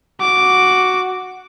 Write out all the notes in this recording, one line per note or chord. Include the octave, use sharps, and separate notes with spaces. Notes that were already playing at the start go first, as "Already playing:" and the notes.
F#4 D6